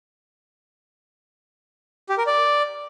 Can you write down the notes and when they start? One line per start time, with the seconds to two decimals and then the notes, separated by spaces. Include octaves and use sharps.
2.09 G4
2.18 A#4
2.27 D5